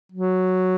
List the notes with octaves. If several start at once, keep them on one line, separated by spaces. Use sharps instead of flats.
F#3